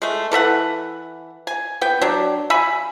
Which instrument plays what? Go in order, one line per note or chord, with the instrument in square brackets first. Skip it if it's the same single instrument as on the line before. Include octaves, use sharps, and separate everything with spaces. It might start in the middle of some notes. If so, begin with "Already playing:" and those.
[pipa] G#3 A3
E3 A4 E5 F#5
G#5
B3 G5
F#3 D4
E5 G#5 B5